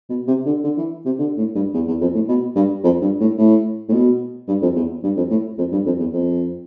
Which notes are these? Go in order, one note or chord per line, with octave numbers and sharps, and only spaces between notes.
B2
C3
D3
D3
E3
C3
D3
A2
G2
E2
E2
F2
A2
B2
G2
F2
G2
A2
A2
A2
B2
G2
F2
E2
G2
F2
A2
F2
G2
F2
E2
F2